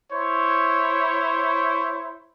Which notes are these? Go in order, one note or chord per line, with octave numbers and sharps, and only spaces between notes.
E4 C5 C#5